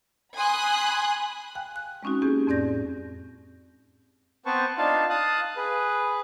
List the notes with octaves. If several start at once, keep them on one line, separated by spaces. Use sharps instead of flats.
G#5 B5 C6 D#6 F#6
F5 G5 G#5 F#6
F#6
G#3 C4 C#4 D#4 F#4
A#3 C4 C#4 E4 G4 G#4
F2 A2 C4 D5 G6 A#6
B3 C4 B4 C5 A5 C#6
D4 D#4 F4 F5 A5
F5 A5 D#6 F#6
G#4 B4